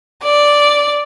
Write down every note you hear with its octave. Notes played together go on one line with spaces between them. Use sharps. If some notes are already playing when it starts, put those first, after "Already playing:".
D5